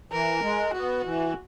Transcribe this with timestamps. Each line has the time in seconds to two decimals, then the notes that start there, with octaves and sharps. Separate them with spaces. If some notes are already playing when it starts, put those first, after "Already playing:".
0.12 E3 A#4
0.43 G#3
0.73 B3 F#4
1.05 E3